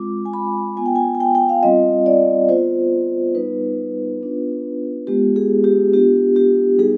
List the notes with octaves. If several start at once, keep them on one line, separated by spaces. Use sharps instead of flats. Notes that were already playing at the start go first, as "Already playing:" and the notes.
Already playing: G#3 C4 F4 D6
G#5
B5
B3 F4 G#5
G5
G#5
G#5
G5
G5
F5
G3 C4 F4 D#5
D5
B3 F4 C5
G3 B3 D#4 B4
B3 D4 F4
G#3 B3 F4 G4
G#4
G4
B3 D4 F4 G4
G4
G3 B3 D#4 G#4